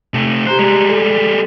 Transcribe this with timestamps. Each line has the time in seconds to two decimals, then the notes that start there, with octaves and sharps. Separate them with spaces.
0.14 C3 A3
0.47 G4 C5 A#5 F#6
0.59 G3 G#3
0.89 A4